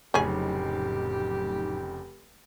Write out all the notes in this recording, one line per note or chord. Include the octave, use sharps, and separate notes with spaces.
F1 A2 C#3 F#3 C#4 D#4 G4 G#4